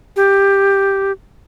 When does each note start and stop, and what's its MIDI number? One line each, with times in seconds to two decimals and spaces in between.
0.16 1.12 67